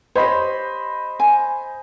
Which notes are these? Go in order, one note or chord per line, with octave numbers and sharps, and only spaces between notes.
G4 C5 C#5 D#5 B5
G#5